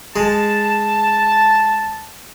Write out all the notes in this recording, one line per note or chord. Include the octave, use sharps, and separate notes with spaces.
G#3 A5